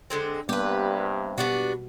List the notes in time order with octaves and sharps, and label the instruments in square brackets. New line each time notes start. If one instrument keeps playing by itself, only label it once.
[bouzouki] D3 G#3 C4
[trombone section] G2 C3 [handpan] G3 A#3 B3 [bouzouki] G4 B4
[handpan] B2 [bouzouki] B3 D4 F#4 [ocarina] G4